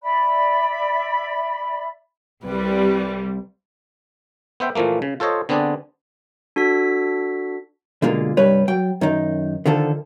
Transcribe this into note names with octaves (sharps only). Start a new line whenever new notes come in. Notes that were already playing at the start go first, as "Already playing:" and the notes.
D5 E5 B5
C2 G3 B4
B3 C5 E5 G5
A#2 E3 F3 A3 A#3
C#3
F4 A4 C5 C#5 D#5
D3 B3 C4 D4 G#4 D5
D4 F#4 A4 B6
B2 D3 G#3 A#3 F4
C2 G2 G3 B4 C#5
F#3 G5
F#2 D#3 D#4
D3 D#3 F3 A4